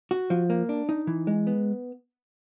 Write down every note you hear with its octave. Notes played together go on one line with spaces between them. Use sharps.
F#4
F3
A#3
D4
D#4
E3
G#3
B3